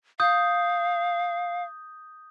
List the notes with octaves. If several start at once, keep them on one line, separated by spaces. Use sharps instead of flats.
F5 D#6 G6